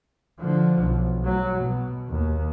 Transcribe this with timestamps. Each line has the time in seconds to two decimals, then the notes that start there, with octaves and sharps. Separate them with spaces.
0.39 D3 F3
0.81 B1
1.24 F#3
1.58 B2
2.09 D#2